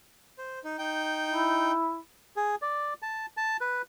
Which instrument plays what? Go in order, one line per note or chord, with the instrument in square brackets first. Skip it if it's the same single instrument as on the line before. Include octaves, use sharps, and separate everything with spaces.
[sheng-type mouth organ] C5
D#4
D#4 G5
[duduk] E4
[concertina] G#4
D5
A5
A5
B4